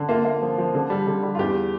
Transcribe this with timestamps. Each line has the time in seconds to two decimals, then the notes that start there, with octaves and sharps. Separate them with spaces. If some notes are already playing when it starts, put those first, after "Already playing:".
Already playing: D3
0.09 A#3 F4
0.25 A#3
0.42 F3
0.58 F3
0.75 D3
0.90 G3
1.07 D3
1.23 G3
1.35 F4
1.39 E2 G4